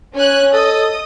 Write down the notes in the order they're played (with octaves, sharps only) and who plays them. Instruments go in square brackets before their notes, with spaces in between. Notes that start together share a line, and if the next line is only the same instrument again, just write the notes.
[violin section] C#4 G#5 F#6 [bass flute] C#5
[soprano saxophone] A4 [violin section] D#5 D#6